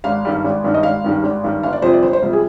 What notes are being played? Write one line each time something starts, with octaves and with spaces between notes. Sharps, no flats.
G#1 F5
G2 D#3 G3
G#1
G2 D#3 G3
D#5
G#1 F5
G2 D#3 G3
G#1
G2 D#3 G3
G1 F5
D5
F2 C3 G3 C5
D5
G1 C5
C5
F2 C3 G3
G#4